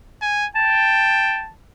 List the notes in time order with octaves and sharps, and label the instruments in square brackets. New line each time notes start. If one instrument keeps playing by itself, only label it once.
[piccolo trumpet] G#5
[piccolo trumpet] G5 [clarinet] A5